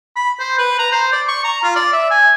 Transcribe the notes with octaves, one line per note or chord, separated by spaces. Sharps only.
B5
C5
B4
A#5
C5
D5
C#6
A#5
F4
D5
E5
G#5